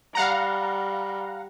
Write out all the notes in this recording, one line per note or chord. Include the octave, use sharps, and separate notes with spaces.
G3 F5 F#5 A#5